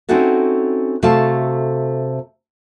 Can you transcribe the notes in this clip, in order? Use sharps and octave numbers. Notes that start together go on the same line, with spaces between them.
C4 C#4 D#4 E4 F#4 A4
C3 A3 F#4 A4 F5 A5